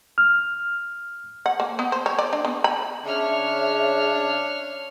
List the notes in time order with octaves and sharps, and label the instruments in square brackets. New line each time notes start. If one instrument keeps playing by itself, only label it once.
[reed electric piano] F6
[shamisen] F#5
A#3
B3
C5
C#5
D5
D4
B3
B5
[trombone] C#3 [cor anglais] D4 [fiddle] C#5 F6 [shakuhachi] E5